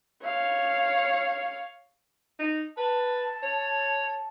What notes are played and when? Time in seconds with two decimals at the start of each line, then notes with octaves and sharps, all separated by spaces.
0.24 C#5 F5
2.39 D#4
2.77 B4 A5
3.43 C#5